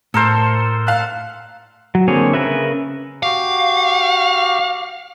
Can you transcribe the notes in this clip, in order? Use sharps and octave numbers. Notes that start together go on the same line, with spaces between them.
A2 A4 A#4 C5
F5 F#6
F#3
D3 A#3 C4 G#4 C#5
C#3 F3 A#4 B4 E5
F#4 G4 F5 D6